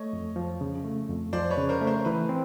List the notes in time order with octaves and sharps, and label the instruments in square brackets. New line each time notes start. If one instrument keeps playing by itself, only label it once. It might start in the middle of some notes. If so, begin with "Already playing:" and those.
Already playing: [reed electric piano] A3 [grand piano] C#5 D#5
[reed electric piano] F2
F3
C#3
A3
F2
[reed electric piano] F3 [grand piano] C5 D5
[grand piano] B4 C#5
[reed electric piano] C#3
[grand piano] A#4 C5
[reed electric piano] A3
[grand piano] A#4 C5
[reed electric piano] E3 [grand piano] B4
[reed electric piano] C4